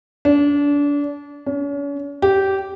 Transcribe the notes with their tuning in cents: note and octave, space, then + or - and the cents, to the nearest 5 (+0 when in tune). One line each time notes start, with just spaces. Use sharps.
D4 -30
C#4 +40
G4 -15